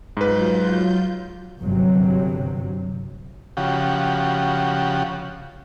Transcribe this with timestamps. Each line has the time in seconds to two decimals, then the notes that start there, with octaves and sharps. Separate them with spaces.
0.17 G#2 F#3 F4 B4 G6
1.60 G1 G2 C3 F#3
3.57 C#3 F3 F#4 G4